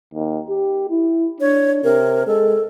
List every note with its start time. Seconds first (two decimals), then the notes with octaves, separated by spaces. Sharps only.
0.14 D#2
0.49 G4
0.90 E4
1.40 D4 C#5
1.84 C3 A#4
2.27 G#3 A4